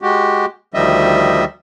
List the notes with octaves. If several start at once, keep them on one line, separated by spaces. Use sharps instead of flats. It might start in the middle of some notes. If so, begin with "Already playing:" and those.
G#3 F#4 G4
D2 D#3 F3 G3 D#5 E5